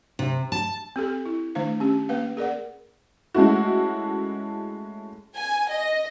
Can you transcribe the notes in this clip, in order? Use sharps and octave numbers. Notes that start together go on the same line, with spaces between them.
C3
A5
C4 G4 A4
E4
D#3 A3 D4 C5 F5
C#4 G4
A#3 B4 F5
G#4 A#4 D5 F#5
G#3 A3 C#4 E4 F#4
G#5
D#5